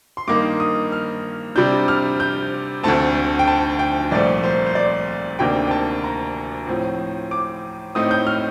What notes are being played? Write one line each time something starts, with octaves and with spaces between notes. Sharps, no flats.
C6
G2 D#3 A#3 D#4 D6
D#6
F6
C3 G3 D4 G6
F6
G6
D2 D3 A3 C4 A5
G5
A5
G5
C2 A#2 F3 A3 D5
C5
C5
D5
D2 C3 D#3 A#3 D4 G5
G5
A5
A#5
A2 F3 C4
D6
A2 A3 C4 D#4 D#6
G6
F6